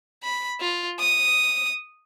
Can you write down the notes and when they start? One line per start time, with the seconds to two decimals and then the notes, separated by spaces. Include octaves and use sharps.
0.23 B5
0.60 F4
0.99 D#6